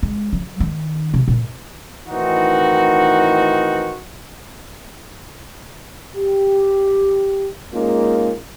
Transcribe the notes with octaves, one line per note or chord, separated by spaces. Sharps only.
G#3
F#3
D#3
C3
A#2
A2 D#3 E3 C4 D#4 F#4
G4
G#3 A#3 C#4 D#4 F4 G#4